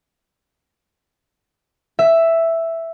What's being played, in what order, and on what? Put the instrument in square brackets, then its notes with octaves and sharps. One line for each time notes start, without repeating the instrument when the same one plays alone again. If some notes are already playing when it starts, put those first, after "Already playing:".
[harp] E5